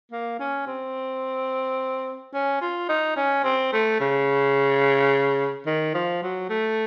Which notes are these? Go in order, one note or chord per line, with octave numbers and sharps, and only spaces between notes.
A#3
C#4
C4
C#4
F4
D#4
C#4
C4
A3
C#3
D#3
F3
F#3
A3